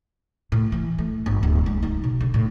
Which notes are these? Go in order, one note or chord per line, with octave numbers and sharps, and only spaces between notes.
A2
E3
A3
G1
D1
G#3
D#4
B2
D3
A2